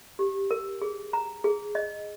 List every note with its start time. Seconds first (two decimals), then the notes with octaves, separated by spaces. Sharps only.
0.19 G4
0.51 A#4
0.82 G#4
1.13 A#5
1.44 G#4
1.75 D#5